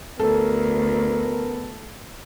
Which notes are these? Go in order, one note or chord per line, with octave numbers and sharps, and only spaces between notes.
D2 B3 A4 A#4